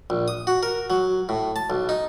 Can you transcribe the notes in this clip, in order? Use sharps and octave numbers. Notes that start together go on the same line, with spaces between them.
A#1
D#6
F#4
A#4
F#3
A2
A5
B1
D#4